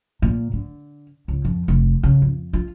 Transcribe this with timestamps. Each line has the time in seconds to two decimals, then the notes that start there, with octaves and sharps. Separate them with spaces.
0.22 A#2
0.53 D3
1.28 C#2
1.45 F2
1.68 F1
2.03 C#3
2.22 F2
2.53 F4